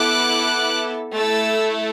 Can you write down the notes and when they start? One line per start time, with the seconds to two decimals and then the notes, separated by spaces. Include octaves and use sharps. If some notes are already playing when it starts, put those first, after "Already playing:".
Already playing: B3 E4 A4 D6 F#6
1.15 A3 E4 A4 E6 A6